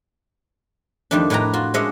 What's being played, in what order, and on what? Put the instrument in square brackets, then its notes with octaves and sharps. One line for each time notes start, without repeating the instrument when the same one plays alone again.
[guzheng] F2 D#3 G3 A3 D4
A2 D4 B4 G5 A#5
F4 F#4
G#3 C#4 D4 D#5 E5 F#5